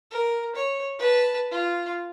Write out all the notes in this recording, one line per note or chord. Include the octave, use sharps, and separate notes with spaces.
A#4
C#5
B4 A5
F4